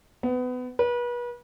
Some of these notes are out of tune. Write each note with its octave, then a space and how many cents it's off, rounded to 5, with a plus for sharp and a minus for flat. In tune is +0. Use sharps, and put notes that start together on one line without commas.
B3 +25
B4 -35